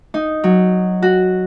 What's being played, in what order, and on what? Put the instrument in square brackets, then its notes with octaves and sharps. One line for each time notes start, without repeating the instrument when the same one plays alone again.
[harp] D#4
F#3
F#4